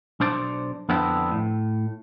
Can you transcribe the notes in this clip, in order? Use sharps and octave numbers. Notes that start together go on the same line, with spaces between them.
B1 D4 C5 D5
F2 D3 B3 C4 D4 E4
A2